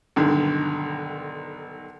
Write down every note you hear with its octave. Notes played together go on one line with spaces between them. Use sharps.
B1 G2 D3 D#3